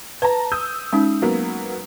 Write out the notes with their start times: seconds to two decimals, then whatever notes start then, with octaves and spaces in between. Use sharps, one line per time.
0.22 B4 A5 A#5
0.52 D#6 E6 G6
0.93 G#3 C#4 D#4
1.22 F#3 A#3 B3